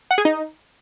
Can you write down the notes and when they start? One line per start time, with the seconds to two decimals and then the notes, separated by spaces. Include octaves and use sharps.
0.11 F#5
0.18 G#4
0.25 D#4